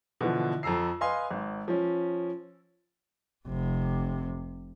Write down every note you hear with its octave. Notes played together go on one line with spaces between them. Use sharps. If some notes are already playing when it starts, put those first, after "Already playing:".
B2 D3 E3 F3
F2 A4 A#5 E6 C7
B4 D#5 F5 G#5 C6
G#1
F3 C#4
F1 C3